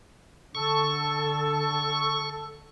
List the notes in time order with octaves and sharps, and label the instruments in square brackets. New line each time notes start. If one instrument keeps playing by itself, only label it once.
[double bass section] D3 [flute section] A4 E6 [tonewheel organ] C#6